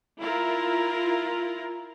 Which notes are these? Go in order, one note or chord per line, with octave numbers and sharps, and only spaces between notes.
E4 F4 A#4